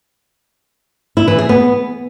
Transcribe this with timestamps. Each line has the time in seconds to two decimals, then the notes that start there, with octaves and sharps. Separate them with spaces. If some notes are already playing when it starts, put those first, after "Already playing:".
1.17 E4
1.28 E3
1.38 G#4
1.49 B3